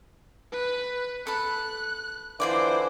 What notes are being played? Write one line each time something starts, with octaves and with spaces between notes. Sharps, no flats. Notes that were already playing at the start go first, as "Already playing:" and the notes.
B4
A4 B5 F#6
D3 E3 E4 F4 C5 D5 D6